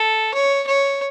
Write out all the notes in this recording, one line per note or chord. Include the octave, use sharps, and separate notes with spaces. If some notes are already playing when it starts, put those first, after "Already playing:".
Already playing: A4
C#5
C#5